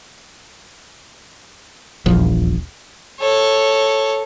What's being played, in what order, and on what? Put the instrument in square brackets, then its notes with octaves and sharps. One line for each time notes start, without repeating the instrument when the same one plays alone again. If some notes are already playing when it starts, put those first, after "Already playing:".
[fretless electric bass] D#1 A#1 E2 F3
[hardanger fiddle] A4 C#5